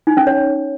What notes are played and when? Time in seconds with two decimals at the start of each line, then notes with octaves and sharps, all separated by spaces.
0.07 D#4
0.17 C#4
0.27 C#5